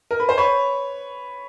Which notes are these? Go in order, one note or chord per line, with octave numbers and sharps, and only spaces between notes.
A#4
B4
C5
B4 C#5